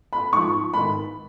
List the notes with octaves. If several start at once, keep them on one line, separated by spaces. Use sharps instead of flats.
B5
G#2 F3 C#6
G#2 D#3 B5